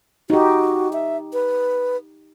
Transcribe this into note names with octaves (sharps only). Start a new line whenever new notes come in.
D#4 F#4 G4
E5
B4